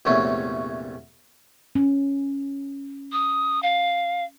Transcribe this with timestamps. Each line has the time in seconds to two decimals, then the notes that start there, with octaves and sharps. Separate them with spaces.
0.05 A#1 E2 C3 F#3 A3 C#4
1.75 C#4
3.12 D#6
3.63 F5